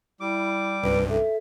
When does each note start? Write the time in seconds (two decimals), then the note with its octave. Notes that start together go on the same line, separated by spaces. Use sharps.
0.20 G3 E4 D6
0.83 C2 G2 B4
1.09 A4 E5